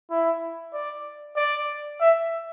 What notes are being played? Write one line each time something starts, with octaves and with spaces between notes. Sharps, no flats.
E4
D5
D5
E5